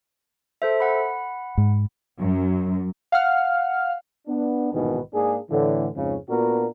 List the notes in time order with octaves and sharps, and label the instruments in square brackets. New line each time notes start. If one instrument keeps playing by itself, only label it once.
[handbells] A4 C5 E5
F#5 B5
[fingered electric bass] G#2
[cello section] F#2
[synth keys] F5 F#5 F6
[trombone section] B3 D4
A#1 G#2 B2 D#3 E3 B4
G#2 A#3 D4 G#4
A2 D3 E3
F2 G#2 C#3
A#2 B3 D4 F4 F#4 A#4